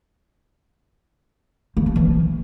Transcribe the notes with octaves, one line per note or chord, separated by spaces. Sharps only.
A#3
D4
E3